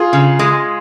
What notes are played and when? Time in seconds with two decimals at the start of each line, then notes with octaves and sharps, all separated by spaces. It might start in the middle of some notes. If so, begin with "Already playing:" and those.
Already playing: F4 G#4
0.13 C#3
0.39 G#3